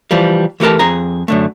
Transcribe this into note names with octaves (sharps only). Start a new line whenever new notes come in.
E3 F3 G3
E3 A3 G4 A#4 A5
F2 G#4 A#5
F#2 D3 A3